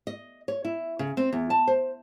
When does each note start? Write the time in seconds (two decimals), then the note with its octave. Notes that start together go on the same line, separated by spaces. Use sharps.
0.07 D#5
0.48 C#5
0.65 E4
0.99 C#3
1.17 C4
1.33 E2
1.50 A5
1.67 C5